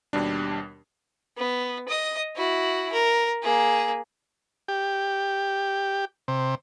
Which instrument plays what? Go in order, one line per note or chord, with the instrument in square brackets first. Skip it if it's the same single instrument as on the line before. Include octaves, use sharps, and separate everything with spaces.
[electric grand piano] D#2 B2 G3 D4
[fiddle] B3
D#5 D#6
E4 F#4
A#4
A#3 G#4
[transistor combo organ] G4
C3